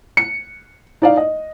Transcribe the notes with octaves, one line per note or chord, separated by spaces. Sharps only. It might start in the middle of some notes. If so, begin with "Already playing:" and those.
C#7
D#4 D5 F5
D#5